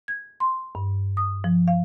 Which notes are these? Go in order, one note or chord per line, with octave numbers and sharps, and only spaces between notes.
G#6
C6
G2
D#6
F3
F5